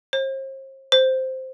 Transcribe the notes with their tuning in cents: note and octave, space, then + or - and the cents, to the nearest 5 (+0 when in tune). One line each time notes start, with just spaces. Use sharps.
C5 +40
C5 -5